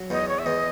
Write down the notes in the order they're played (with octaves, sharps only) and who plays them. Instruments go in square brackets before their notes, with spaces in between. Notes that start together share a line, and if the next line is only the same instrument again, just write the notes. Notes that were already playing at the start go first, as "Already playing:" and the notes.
Already playing: [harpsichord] F#3
[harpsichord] E2 [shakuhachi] D#5
[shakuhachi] C#5
E5
[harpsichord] E2 [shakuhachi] D#5